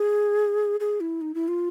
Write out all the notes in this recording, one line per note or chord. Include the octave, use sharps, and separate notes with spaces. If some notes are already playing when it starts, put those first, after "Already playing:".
Already playing: G#4
G#4
E4
D#4
E4
F4